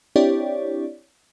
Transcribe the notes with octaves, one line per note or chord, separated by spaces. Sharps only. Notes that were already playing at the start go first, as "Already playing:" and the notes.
C4 D4 E4 G4 C#5 D5